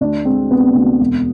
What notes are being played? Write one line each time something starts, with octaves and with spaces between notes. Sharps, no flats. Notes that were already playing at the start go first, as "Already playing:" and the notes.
D2 D4
G#3 C4
C3 B3
D2
E1